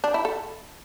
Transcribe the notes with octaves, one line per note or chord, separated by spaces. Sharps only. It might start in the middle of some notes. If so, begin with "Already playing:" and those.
D4
E4
A4